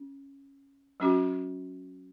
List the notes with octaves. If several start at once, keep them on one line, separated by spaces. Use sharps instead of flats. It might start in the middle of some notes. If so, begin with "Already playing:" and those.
Already playing: C#4
F#3 C#4 F#4